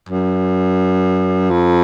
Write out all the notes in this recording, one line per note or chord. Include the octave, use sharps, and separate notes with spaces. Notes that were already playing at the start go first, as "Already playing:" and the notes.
F#2
F2